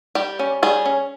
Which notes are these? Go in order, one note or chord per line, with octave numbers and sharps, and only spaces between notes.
G3 G4
C#4
G3 G#4
C#4